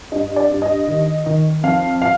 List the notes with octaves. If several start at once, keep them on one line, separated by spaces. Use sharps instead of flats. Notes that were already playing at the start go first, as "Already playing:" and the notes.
G2 D#5
D5
G2
D#5
D#3
D#3
F2 F5
F5